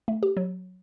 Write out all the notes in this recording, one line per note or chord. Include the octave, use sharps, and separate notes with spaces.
A3
G4
F#3